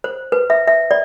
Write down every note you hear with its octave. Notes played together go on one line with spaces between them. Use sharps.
C5
B4
E5
E5
D5